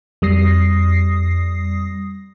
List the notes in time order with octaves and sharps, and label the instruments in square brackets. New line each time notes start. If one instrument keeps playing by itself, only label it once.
[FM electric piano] F2 G3 D#6 A#6 C7